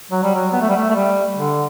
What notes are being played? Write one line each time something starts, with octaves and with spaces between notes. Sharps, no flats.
F#3
G3
F#3
B3
A3
G3
A3
A3
G3
D3